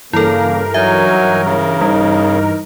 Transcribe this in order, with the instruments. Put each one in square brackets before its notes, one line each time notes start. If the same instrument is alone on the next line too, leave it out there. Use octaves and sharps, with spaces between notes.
[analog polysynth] G2 E3 A#4 [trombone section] C#3 A#3 [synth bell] E4 A4
[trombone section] F#3 [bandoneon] D#4 G#5 [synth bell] E5
[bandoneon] C#3
[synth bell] G3 [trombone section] D#4